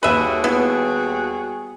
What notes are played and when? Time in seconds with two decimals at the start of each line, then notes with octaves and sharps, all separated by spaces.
0.03 D#2 G3 F#4 G#4 B4 E5 D#7
0.44 B3 E4